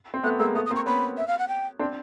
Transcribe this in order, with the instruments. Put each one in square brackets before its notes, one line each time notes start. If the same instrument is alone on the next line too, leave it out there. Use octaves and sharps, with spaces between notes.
[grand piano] C4
[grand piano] A3 B3 [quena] F#6
[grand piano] G#3 A#3 [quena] E6
[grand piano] A3 B3 [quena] D#6
[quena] D#6
[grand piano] A#3 C4
[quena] C#6
[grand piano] B3 C#4 [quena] B5
[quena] E5
F5
F#5
G5
[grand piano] C4 D4